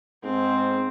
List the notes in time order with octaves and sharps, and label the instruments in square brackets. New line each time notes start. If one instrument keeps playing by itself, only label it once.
[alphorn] G#2 [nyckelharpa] C4